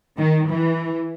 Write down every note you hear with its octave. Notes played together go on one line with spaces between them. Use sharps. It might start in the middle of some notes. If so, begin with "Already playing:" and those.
D#3
E3